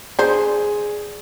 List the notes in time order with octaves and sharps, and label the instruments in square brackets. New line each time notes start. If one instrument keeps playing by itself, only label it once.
[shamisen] D4 C5 [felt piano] G#4